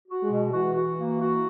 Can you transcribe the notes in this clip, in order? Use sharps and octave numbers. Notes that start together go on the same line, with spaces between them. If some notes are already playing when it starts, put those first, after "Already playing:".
F#4
G#3
B2
E3 F#4
F#4
A#3
F#4